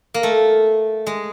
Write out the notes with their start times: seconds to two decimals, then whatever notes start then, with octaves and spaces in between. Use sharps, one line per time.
0.14 A#3
0.23 A3
1.07 G#3